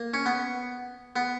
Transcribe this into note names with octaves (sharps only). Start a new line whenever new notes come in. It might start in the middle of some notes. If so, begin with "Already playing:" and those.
Already playing: A#3
C#4
B3
B3